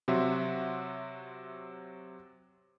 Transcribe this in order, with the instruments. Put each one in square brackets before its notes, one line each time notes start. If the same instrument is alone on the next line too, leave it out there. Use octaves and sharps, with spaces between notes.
[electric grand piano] C3 F#3 F#4 E5 C6